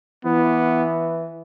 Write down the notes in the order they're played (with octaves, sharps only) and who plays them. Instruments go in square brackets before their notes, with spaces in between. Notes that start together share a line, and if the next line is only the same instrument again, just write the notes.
[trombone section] E3 [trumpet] B3